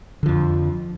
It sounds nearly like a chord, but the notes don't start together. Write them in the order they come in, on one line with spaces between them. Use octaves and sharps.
D3 F3 F2